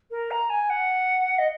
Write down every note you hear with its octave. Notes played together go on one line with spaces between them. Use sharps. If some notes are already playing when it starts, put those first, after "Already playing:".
A#4
A#5
G#5
F#5
D#5